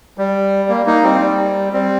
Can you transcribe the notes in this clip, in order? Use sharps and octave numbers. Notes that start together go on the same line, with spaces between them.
G3
A#3
A#3 D#4
G3 C4
G3
G3 C4